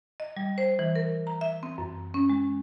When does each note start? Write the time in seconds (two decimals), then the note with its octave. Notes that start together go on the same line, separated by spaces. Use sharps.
0.20 D#5
0.37 G3
0.58 C5
0.79 E3
0.96 A#4
1.27 A#5
1.41 E5
1.63 C4
1.78 F#2
2.14 C#4
2.30 G#3